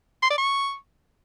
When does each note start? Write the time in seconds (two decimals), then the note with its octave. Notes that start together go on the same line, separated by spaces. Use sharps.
0.22 C6
0.30 D5
0.38 C#6